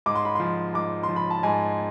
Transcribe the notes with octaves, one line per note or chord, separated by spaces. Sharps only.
G#2 D6
C6
B5
F3 C6
G#2 D6
C6
F3
B5
A5
G#2 G#5